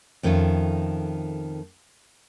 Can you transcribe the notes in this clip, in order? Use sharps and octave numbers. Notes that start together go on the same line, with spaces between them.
F2 D#3 A3 C#4 F4